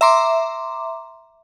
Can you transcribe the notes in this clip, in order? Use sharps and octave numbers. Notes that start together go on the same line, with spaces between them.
E5 A#5 C6 D6